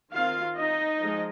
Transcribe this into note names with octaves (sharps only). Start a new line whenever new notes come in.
D#3 C4 F4 F5
D#4 D#5
F3 G#3